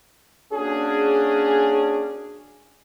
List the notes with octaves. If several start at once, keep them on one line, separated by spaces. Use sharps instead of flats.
A#3 C#4 D4 F#4 G#4